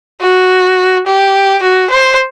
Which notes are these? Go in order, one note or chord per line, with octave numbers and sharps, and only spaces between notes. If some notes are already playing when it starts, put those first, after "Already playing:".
F#4
G4
F#4
C5